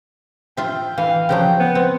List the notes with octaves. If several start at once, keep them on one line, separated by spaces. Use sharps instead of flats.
F4 E5 G5
E3 F5
C#3 F3 F#3 G5
B3
C4